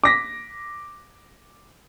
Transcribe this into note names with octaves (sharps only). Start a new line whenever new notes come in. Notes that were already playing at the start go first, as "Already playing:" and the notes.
D6 A#6 B6